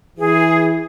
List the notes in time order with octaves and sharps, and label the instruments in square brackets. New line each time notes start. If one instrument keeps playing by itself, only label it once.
[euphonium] E3 [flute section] G#4